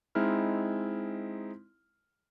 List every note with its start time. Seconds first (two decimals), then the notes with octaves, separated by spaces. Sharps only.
0.15 G#3 C4 D#4 E4 F6